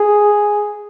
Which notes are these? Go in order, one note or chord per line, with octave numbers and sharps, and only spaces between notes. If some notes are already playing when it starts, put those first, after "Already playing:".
Already playing: G#4